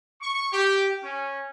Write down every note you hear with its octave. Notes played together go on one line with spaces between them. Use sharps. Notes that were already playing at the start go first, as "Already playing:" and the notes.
C#6
G4
C#4